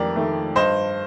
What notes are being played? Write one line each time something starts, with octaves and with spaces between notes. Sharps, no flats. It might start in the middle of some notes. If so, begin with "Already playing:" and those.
Already playing: F2 D#3 G4 A#4 D5
D#3 A3
G2 C5 D#5